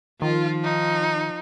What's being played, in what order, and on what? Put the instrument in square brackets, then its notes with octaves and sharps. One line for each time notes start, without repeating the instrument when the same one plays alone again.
[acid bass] D#3 [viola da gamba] F3 [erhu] F4
[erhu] D#4